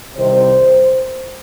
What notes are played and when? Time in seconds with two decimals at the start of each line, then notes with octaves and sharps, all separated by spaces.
0.16 C2 C3 D#3 C5